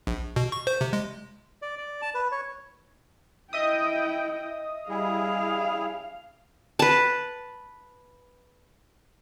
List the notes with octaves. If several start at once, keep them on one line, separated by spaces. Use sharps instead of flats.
A#1
B2
C#6
C5
C3
G#3
D5
D5
A5
B4
C#5
E4 D#5 E5 G5 D#6
G3 E4 G#4 F5
B4 A5